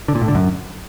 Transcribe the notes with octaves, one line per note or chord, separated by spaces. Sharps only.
D3
A#2
A2
D3
F#2